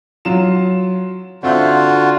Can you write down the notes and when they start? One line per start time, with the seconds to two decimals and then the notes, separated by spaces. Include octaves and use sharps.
0.25 F#3 F4 E7
1.43 D3 C4 F4 F#4 E5 G6